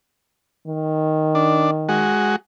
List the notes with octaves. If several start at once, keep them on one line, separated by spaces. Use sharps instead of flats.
D#3
D4
G#3 F#4